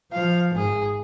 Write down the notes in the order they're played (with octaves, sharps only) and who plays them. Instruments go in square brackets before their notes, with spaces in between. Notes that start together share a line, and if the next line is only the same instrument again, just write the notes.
[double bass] F3 [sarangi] F5
[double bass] G#1 [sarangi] G#4